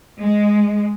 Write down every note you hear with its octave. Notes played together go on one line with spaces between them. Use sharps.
G#3